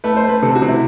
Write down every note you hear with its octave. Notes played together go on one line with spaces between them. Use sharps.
A3 B4
C5
A3
B4
C3 A4
F#4
C3
E4